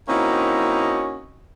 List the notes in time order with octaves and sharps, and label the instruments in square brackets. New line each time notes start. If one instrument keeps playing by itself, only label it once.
[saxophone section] A#3 C4 C#4 D#4 E4 F#4